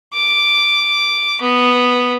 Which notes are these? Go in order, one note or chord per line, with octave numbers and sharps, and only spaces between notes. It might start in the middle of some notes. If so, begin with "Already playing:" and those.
D6
B3